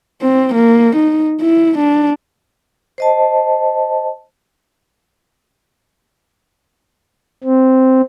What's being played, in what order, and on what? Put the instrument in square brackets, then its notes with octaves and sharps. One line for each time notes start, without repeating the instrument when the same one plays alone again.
[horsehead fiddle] C4
A#3
D#4
E4
D4
[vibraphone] C5 D#5 A5
[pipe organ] C4